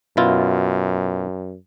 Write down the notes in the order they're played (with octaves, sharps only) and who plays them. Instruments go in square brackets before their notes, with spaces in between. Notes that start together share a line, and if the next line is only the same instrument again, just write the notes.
[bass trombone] F#2 [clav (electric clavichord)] B2 E4 F4